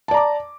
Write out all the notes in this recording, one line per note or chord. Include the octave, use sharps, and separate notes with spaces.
D5 A5 A#5 D6